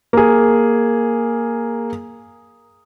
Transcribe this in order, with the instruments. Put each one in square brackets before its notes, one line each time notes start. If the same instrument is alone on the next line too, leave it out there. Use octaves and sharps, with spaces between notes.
[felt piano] A#3 G#4